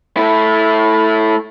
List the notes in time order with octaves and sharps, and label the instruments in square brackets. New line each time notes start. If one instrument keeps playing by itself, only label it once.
[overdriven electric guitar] A3 E4